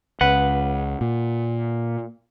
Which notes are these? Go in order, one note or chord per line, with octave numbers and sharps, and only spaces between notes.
C#2 B4 F#5
A#2